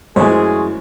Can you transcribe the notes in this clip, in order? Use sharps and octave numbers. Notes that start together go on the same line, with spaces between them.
F#2 E3 G#3 A3 G#4 C5 C#5